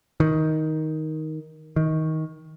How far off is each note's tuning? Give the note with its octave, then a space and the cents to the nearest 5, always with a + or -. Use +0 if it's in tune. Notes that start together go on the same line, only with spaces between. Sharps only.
D#3 +10
D#3 +20